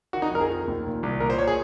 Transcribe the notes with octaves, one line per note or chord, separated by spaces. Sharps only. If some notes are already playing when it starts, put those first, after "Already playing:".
D#3 F#4
D#4
F2 A#4
G#4
D#3
D#2
A#2
C2
A#2 A#4
C5
C#5
G#4